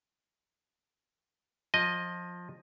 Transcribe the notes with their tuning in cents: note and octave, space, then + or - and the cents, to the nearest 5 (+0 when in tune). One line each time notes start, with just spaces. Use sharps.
F3 +20 D#5 +0